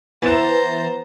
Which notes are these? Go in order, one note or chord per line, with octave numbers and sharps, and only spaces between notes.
E3 B3 C5 A#5 A6 E7